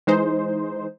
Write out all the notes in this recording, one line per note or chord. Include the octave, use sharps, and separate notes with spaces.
E3 G#3 D#4 C5